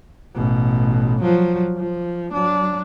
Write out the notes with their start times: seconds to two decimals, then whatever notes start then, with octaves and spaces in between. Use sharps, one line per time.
0.35 A1 B2
1.21 F3 F#3
1.78 F3
2.33 F#3 D4